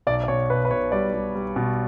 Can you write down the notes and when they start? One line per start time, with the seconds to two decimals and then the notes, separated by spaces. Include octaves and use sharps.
0.07 B1 D5
0.24 D5
0.28 B2 C#5
0.50 B1 B4
0.65 B4
0.71 B1 C#5
0.92 G3 D5
1.14 G3
1.35 G3
1.56 B2